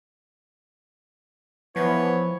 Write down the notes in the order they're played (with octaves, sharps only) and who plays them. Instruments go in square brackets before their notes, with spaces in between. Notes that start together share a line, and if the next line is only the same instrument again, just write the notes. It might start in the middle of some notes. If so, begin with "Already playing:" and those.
[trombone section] E3 [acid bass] F3 [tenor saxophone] B3 [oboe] C#5